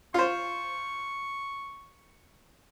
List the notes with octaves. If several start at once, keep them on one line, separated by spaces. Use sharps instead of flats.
F4 C5 C#6